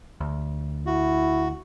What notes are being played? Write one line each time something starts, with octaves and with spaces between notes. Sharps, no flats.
D2
E4 F#4